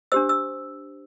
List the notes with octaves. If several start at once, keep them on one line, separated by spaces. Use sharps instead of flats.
D4 G4 C5 E6
E6